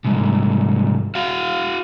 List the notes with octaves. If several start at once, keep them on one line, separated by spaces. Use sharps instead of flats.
C2 G#2
F#4 F5